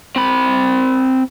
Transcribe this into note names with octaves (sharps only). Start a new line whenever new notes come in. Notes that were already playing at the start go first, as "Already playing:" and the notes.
C4 B5